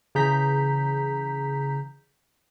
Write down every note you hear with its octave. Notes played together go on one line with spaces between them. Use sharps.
C#3 E3 G#4 A#5 G6 B6